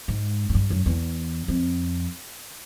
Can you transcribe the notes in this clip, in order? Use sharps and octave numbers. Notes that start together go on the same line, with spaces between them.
G#2
G#2
G2
F#2
E2
F2